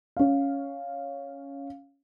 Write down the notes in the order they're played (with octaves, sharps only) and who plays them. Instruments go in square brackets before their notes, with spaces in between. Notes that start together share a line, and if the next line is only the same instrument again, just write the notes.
[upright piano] C#4 F5